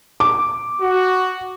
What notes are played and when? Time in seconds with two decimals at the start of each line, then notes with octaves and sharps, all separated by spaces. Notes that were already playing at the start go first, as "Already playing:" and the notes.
0.20 D6
0.81 F#4